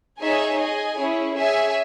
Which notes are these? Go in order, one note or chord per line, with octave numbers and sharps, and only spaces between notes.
D#4 G#4 C#5 E5 G#5
G#4 D#5 G#5
C#4 E4 G#4 C#5
G#4 C#5 E5 G#5